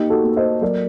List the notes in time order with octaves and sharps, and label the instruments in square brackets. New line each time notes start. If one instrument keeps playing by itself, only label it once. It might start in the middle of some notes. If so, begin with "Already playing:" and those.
Already playing: [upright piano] A#3 D#4 G4
F#4 A4
A#3
C5 D#5
F#3 A#4 D5